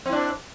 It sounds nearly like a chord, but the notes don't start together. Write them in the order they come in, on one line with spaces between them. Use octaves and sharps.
C4 E4 D4